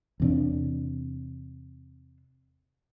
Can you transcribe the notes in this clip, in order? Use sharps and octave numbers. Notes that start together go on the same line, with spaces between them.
E2 C3 D4